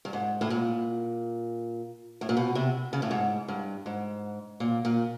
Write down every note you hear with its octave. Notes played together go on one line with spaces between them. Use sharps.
G2
G#2
A2
A#2
A2
A#2
B2
C3
C#3
A2
G#2
G2
G#2
A#2
A#2